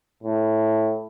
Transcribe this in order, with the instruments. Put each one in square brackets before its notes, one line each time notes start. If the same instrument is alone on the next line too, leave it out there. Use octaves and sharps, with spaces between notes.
[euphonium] A2